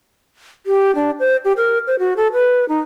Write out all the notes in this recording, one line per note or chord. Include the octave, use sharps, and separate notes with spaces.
G4
D4
C5
G4
A#4
C5
F#4
A4
B4
D#4